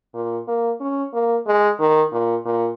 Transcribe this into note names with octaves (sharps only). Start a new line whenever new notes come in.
A#2
A#3
C#4
A#3
G#3
D#3
A#2
A#2